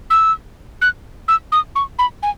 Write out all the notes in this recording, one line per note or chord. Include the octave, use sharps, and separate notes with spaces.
E6
F#6
E6
D#6
C#6
B5
G#5